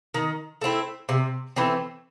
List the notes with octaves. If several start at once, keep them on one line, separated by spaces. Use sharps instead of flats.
D#3
A3 C4 E4
C3
E3 A3 C4